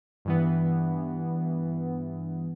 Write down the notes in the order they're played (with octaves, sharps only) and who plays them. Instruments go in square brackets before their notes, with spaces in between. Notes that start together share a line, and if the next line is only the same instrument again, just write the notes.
[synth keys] G2 E3 B3